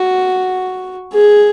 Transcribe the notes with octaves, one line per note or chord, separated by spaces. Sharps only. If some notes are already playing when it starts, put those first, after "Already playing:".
Already playing: F#4
G#4